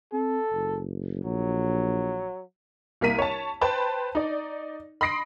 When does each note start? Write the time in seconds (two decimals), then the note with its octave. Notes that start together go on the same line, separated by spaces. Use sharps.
0.13 C4 A4
0.52 F#1
1.25 A#1 F#3
3.01 C2 A#3 A#4 B6 D#7
3.18 C#5 A5
3.61 B4 C5 G5 A5 B5
4.15 D#4 D5
5.01 B5 C6 D#6 A#6 C7 D7